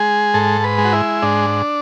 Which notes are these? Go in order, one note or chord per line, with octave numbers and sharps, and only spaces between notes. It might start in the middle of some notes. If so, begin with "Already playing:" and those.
Already playing: G#3 G#4
G#2 A4
B4
G#3
F#4
E4
G#2 D4